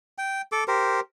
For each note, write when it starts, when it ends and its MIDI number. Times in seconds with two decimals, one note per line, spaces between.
0.18 0.42 79
0.52 0.64 69
0.52 0.64 86
0.68 1.00 67
0.68 1.00 70
0.68 1.00 72